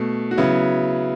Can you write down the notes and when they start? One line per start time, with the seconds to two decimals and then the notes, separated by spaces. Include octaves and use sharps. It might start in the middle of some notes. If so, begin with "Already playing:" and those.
Already playing: B2 A3
0.31 F#4
0.38 C#3 F#3 B3 E4